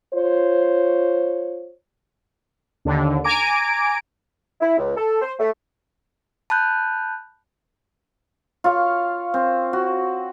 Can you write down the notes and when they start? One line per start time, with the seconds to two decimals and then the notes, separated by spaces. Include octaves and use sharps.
0.14 F4 C5 C#5
2.85 D#2 D3
3.24 G#5 A#5 D6 D7
4.61 E4
4.78 C#2
4.96 A4
5.21 C5
5.39 A3
6.50 A5 B5 F#6 G6
8.64 F4 C#5 F5
9.34 C4
9.73 F#4